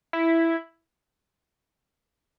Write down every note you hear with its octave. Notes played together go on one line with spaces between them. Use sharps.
E4